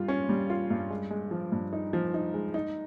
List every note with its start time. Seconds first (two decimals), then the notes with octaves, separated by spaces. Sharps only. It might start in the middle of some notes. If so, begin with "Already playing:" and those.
Already playing: G2 G3 F4
0.08 C#4
0.29 G3
0.50 F4
0.70 G2
0.90 G#3
1.10 G#3
1.31 F3
1.52 G2
1.73 D#4
1.93 F3
2.14 D#4
2.34 G#3
2.54 D#4